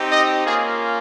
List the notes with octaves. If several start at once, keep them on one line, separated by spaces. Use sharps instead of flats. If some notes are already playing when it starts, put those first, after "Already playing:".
Already playing: C4 D#4 G4
D#5
A#3 C#4 F4 G#4